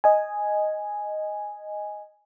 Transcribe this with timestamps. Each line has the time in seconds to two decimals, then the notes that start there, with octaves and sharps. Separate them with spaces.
0.04 D#5 G#5